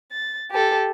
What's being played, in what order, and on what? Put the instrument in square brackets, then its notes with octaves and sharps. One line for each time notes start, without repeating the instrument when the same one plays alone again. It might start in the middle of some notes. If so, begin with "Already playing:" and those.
[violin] A6
G4 A4